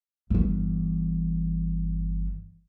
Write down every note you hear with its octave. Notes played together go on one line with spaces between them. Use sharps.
G1 E3